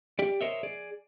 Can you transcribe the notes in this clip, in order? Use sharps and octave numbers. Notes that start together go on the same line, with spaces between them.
G4 D5
A#4 C5 C#5 D#5 E5
G#4 D5